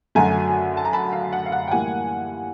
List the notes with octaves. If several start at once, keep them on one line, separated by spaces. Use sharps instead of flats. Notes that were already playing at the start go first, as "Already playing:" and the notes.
F#2 D3 F#3 A3 G#5 A#5
A5
A#5
A5 B5
F5
F#5
F5
F#5
G5
A2 E3 G3 A#3 F#5 G#5